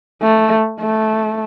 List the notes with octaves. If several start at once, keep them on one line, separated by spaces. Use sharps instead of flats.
A3
A3